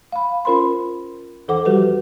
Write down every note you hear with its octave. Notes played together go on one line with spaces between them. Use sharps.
F5 B5
C#4 F4 A#4 C5 B5 C6
E2 E3 A4 C5 F#5 D6
F3 G3 F#4 G4 B4